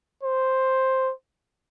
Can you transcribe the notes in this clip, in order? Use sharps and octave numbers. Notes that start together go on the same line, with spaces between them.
C5